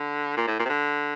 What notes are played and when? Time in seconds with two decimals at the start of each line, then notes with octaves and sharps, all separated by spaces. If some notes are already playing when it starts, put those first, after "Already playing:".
Already playing: D3
0.37 A#2
0.48 A2
0.60 A#2
0.66 C3
0.70 D3